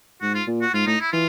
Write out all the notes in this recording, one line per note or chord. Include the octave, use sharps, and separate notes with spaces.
G#2 F#4
F4
A#2
F#4
G#2 F4
A2 D#4
E4
E3 F4